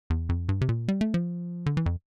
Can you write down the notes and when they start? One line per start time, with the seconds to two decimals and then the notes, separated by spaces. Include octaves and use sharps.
0.10 E2
0.29 F2
0.49 G2
0.61 C3
0.69 A#2
0.88 G3
1.01 A3
1.14 F3
1.66 D3
1.77 E3
1.86 F2